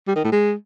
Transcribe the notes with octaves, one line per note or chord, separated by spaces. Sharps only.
G3
D#3
A2
G#3